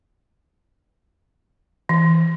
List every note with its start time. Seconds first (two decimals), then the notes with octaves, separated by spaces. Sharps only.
1.89 E3